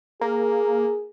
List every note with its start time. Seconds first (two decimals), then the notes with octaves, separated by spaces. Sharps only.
0.21 A#3 G#4